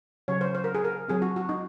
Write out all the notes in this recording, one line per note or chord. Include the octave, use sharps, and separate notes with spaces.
C#3 F#3 C#4 C#5
C5
C5
A#4
G#4
A#4
F#3 C4 G#4
F#4
F#4
D#4